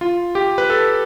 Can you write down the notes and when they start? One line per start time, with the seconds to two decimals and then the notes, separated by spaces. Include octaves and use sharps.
0.01 F4
0.35 G4
0.58 B4
0.70 A4